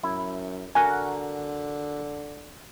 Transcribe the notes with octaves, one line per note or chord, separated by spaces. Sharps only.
F#2 E4
D3 F#4 A#4 F#5 G#5